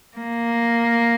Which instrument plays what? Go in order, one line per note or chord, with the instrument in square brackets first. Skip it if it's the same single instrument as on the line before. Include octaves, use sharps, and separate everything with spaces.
[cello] A#3